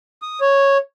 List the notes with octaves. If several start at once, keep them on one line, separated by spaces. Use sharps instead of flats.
D#6
C#5